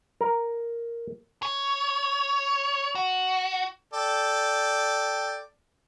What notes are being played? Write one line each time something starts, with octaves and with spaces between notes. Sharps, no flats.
A#4
C#5
F#4
A4 D5 G5